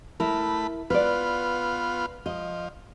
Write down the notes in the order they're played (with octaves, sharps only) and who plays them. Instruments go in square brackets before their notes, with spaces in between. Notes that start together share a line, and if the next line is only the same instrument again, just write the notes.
[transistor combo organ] A3 B5 [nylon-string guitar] E4 A#4
[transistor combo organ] B3 F4 [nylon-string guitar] B4 D5
[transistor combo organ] F3 [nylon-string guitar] D#5